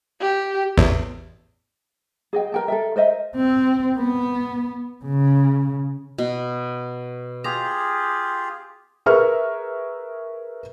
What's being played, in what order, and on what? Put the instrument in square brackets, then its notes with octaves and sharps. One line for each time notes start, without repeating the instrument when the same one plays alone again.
[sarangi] G4
[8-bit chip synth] A1 E2
[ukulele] G#4 D#5 G5
A#4 G5 A5
A4 A#4 E5
A#4 C5 D#5 E5
[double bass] C4
B3
C#3
[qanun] B2
[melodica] F4 G4 G#4 [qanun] A#5
[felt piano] G#4 A#4 B4 E5 C#6 F6